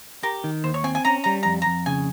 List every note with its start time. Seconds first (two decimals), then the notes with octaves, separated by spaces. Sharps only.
0.23 G4 A#4
0.44 D#3
0.64 D#2 C5
0.74 C#5
0.84 C4 G#5
0.95 G#5
1.05 C#4 A#5
1.24 G3 A#5
1.43 F2 A#5
1.62 F2 A#5
1.86 C#3 G#5